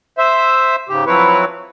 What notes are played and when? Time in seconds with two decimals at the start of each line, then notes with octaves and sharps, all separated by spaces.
0.18 C5 E5
0.89 G#2 C#3 G4
1.06 F3 F#3 C4 E4 B4 C#5